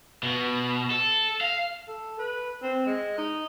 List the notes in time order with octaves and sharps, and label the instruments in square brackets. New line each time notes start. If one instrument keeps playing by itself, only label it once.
[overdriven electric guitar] B2
A4
F5
[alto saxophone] A4
B4
C4
G#3
D#4